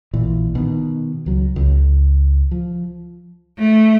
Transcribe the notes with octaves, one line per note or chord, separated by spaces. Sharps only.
A#1 A#2 E3
B2 D#3
C#2 F#3
C#2
F3
A3